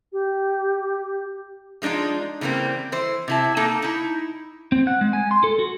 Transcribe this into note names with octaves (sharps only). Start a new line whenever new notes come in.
G4
F3 G#3 D4 D#4 F4
C#3 E3 G3 A#3 C4
E3 C5
C3 E4 A5
A#3 D#4 A4 A5
D#4 E4
C4
F#5
G#3
G#5
C6
A4
F#4